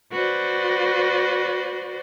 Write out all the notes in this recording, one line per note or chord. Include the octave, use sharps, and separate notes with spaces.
F#4 B4 C5 D5